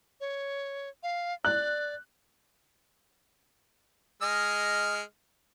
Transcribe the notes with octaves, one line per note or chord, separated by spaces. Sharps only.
C#5
F5
D5 F#6
G#3 D#5 F6